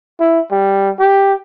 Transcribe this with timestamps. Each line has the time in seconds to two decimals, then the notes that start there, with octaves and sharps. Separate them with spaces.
0.20 E4
0.51 G3
0.99 G4